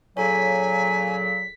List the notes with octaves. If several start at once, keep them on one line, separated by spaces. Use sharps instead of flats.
A#2 C#3 F#3 G#4 A4 C#5 G#5 B6